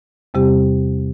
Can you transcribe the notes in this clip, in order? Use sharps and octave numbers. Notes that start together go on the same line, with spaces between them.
E2 C3 G3 C4 G4